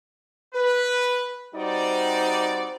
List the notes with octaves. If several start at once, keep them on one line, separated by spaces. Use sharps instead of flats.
B4
G3 C4 D#4 F#4 C5 D5